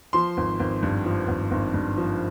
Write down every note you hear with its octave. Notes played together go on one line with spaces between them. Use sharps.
F3 C6
G#1
G#1
G2
F3
G#1
G#1
G2
F3